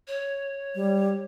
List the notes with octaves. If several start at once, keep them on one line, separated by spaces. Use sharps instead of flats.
C#5
G3